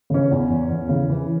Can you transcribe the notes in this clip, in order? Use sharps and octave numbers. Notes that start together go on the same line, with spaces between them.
C#3 C#4
E2
E2
E2
C#3
E3